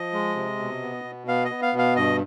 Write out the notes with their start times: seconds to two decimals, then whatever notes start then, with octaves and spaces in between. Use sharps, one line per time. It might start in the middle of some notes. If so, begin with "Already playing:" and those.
Already playing: F3 D#5
0.13 G#3
0.36 C3
0.59 B2
0.82 B3
1.04 B2
1.27 B3 F5
1.45 D#5
1.50 B3
1.62 F5
1.73 B2
1.78 F5
1.96 G2 D#5